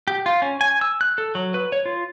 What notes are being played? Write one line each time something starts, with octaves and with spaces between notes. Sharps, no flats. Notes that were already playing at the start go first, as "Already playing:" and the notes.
G4
F4
C#4
G#5
E6
F#6
A4
F#3
B4
C#5
F4